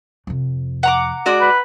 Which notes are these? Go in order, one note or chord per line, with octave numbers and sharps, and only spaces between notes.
F2 C3
F#5 A#5 D6
G#3 F#4 D5
B4